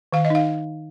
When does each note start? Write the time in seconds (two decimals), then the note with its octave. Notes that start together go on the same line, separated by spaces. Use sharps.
0.13 D#3 F5
0.25 D#5
0.30 D#4 F5